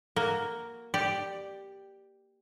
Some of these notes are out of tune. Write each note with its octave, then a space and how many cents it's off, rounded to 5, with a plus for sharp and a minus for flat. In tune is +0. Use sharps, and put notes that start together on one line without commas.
A#3 +0 F#4 +0
G4 +0 D5 +10